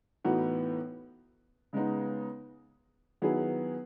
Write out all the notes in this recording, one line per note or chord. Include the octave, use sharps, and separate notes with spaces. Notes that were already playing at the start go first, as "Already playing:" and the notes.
A2 E3 B3 D#4 F#4
C#3 G#3 B3 D#4
D#3 F#3 B3 E4 G#4